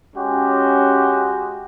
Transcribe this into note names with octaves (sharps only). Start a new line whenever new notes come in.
G#3 C#4 F#4 G4